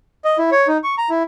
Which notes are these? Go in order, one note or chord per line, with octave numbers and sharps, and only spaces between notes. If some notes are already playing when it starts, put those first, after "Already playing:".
D#5
E4
C#5
D#4
C#6
A#5
E4